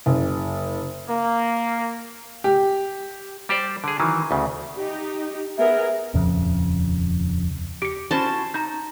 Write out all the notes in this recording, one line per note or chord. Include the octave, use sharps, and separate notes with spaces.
F#1
A#3
G4
G3 G4 C5 D5
D3 G#4
D#3 E3 F#3
D2 C#3
D#4 G4
B3 G#4 A#4 E5
D#1 F2 C#3
G4 C#7 D7
C#4 E4 F#4 C5 A5
D#4 A#5 G6